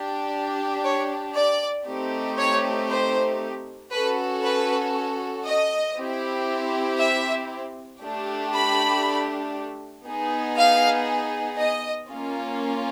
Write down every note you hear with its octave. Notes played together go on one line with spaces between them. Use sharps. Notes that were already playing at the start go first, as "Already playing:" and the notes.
Already playing: D4 G4
C#5
D5
A3 C4 D#4 G4
C#5
C5
C#4 F#4 A4 B4
B4
D#5
C4 E4 G4
E5
A3 D4 G4
B5
B3 D#4 G#4
F5
D#5
A#3 C#4 F4